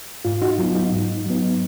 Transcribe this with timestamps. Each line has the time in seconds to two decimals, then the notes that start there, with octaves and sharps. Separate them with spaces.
0.25 G#2 F4
0.42 D#4 F#4
0.58 F#3 B3 F4
0.75 D#4
0.92 G#2
1.26 F#3 B3